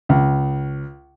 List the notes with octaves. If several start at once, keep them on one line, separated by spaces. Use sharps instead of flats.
C#2